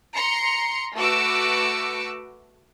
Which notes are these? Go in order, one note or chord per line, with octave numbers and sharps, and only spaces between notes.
A#5 C6 C#7
A3 F#4 B4 D6 E6 C#7